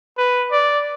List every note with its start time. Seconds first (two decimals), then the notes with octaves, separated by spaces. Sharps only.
0.18 B4
0.51 D5